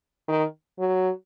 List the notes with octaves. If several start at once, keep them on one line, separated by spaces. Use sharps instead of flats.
D#3
F#3